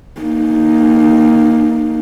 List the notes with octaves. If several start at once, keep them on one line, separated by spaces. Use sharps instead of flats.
A#3 D#4